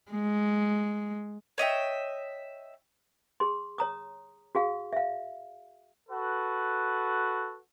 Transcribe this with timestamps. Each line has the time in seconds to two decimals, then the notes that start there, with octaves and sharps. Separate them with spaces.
0.12 G#3
1.58 C#5 D#5 E5 G5
3.40 G#4 C6
3.78 C#5 A#5 D#6
4.55 F#4 G#4 F5
4.93 E5 F5
6.09 F#4 A4 B4